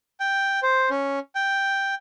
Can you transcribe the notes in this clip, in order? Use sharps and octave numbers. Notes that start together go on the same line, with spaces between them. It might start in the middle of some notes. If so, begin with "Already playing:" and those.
G5
C5
C#4
G5